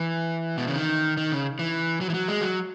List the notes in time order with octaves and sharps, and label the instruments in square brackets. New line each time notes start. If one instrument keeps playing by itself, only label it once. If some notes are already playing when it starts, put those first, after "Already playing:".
Already playing: [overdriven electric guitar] E3
B2
C#3
D#3
D#3
C#3
E3
F#3
E3
F#3
G#3
F#3